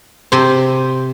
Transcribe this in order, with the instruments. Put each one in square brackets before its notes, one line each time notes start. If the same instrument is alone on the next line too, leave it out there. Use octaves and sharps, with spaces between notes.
[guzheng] C3 C5